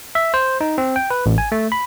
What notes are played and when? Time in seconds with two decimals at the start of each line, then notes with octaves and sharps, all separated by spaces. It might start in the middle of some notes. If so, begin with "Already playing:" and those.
0.15 E5
0.34 C5
0.61 D#4
0.78 C4
0.96 G5
1.11 B4
1.26 A1
1.38 G#5
1.52 A3
1.72 B5